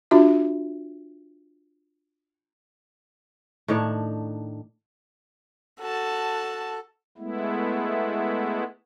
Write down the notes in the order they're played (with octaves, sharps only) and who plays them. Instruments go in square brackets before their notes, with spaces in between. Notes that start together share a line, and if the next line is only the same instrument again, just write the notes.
[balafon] D4 F4 F#4 E5
[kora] A2 D#3 D4 C#5
[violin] F#4 A5 [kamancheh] A4
[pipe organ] G#3 A3 B3 E4